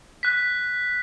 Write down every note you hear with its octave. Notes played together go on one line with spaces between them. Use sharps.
F#6 B6